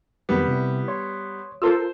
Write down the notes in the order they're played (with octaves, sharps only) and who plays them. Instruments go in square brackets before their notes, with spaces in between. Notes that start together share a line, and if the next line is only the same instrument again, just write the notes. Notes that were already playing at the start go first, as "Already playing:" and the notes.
[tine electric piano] F2 D#3 F#3 [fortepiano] G3 B3
[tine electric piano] C3 E4
C#5 C6
[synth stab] F4 A4 A#4 [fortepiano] C5 E6